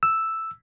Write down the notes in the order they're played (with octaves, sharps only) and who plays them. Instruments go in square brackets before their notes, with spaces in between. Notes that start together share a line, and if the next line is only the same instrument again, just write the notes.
[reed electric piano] E6